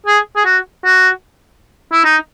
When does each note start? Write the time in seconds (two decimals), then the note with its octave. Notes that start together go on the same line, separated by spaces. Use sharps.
0.06 G#4
0.36 G#4
0.45 F#4
0.85 F#4
1.92 E4
2.04 D#4